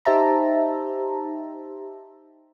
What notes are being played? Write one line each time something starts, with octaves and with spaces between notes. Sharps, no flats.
D#4 G4 C5 E5 A5 A#5